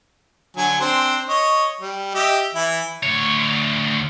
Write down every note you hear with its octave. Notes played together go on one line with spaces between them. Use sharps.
D3 F#3 G#5
C4 D4 C5
C#5 D#5
G3
G4 D#5 E5
E3 E4
D2 C#5